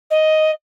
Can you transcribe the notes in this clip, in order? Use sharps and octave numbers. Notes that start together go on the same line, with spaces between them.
D#5